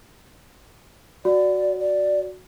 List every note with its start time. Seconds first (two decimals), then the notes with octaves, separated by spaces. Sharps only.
1.25 F#4 D5
1.80 D5